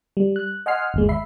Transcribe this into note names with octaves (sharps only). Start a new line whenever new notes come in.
G3
F#6
D#5 F#5 G#5 C6 F6 C7
G1 D#2 G#3
E5 B5 C7